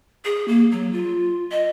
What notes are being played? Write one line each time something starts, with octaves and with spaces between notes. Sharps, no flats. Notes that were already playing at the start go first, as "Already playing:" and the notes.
G#4
A#3
F#3
F4
D#5